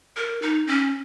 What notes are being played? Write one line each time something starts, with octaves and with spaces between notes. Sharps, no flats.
A#4
D#4
C#4